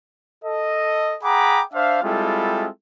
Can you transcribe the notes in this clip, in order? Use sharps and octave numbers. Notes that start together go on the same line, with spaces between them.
A4 D#5
G#4 F#5 G5 A#5 B5 D6
D4 C5 E5 F5
G3 G#3 C4 E4 F4 A4